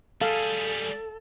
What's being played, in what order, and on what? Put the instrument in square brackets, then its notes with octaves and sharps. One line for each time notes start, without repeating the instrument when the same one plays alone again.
[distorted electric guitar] G3 G#4 [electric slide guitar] A4 [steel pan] F5